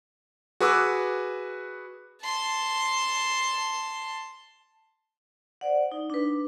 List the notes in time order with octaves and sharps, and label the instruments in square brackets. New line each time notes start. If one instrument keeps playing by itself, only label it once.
[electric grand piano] F#4 G#4 B4 C#6 D6 E6
[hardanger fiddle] A5 C6
[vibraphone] C5 D5 F#5
D#4
D4 B4